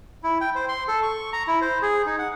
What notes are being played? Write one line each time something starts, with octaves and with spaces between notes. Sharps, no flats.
E4
G5
C5
C6
A4
C#6
A#5
E4
C5
G#4
D#4
F#5